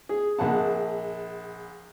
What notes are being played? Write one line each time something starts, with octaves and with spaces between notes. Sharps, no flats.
G#4
A#1 G#4 F#5 A5